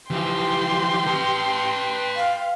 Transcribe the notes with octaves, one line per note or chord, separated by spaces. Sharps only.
E3 F3 G4 G5 C6
B4 A5
F5